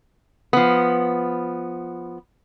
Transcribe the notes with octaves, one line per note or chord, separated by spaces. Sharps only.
F3 B3